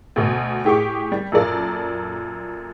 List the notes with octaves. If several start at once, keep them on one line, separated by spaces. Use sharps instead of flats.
D2 B2
A2 G4 G#4 C#6 D6
G3
F#2 A#2 A4 D5